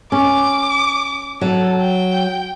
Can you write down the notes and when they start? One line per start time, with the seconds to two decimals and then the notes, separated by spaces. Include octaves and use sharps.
0.12 C#4 D6
1.41 F#3 A4
1.81 G5